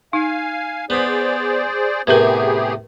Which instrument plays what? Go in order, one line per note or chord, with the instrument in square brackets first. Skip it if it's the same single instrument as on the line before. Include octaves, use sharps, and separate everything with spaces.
[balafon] D#4 [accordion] F5 G#5
[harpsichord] B3 B5 [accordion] G#4 C5 D5
[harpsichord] A2 C3 G#5 [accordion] B3 G4 G#4 [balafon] A#4 B4